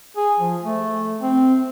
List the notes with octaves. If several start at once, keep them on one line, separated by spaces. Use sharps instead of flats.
G#4
F3
A3
C4